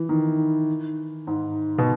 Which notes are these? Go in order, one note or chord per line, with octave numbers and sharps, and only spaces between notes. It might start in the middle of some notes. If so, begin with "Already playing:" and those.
Already playing: E3
D#3
G#2
B2